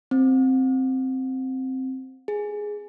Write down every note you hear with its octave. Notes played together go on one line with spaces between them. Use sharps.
C4
G#4